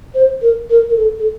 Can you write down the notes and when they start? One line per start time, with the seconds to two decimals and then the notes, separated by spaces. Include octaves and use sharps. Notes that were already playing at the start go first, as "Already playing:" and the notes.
0.15 C5
0.42 A#4
0.70 A#4
0.90 A#4
0.96 A4
1.19 A4